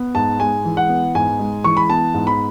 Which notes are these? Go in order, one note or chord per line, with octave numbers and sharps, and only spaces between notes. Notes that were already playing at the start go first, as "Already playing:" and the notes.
Already playing: B3
G#2 A5
G#3 G#5
E3
F#5
B3
G#2 G#5
G#3
E3 C#6
B5
B3 A5
G#2
B5